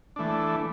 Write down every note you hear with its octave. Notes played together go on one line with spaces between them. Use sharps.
E3 A3 D4